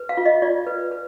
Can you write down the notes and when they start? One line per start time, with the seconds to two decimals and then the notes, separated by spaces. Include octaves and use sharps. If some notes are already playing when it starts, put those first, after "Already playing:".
Already playing: B4
0.09 F5
0.17 F4
0.26 D#5
0.42 F4 D5
0.67 B4
0.91 B4